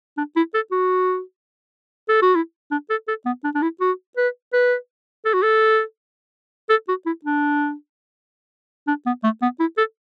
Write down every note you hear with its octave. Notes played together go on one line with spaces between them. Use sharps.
D4
E4
A4
F#4
A4
F#4
E4
D4
A4
A4
B3
D4
D4
E4
F#4
B4
B4
A4
F#4
A4
A4
F#4
E4
D4
D4
B3
A3
B3
E4
A4